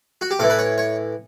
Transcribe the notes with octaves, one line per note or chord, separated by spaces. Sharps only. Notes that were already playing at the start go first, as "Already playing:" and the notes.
F#4
G4
A2 E3 A4
B4
C#5
C#5